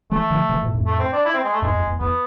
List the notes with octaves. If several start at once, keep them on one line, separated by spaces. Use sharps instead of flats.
E3 G#3 A3
D3 F3
C3 E3
G#2 B2
F2 A2
A3
C4
D4
E4
C4
G#3
A3
E2 G#2 G#3
F2
E2
E2 B3